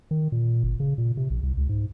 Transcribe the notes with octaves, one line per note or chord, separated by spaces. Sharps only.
D#3
A#2
G1
C#3
A#2
C3
A#1
C2
C#2
G#2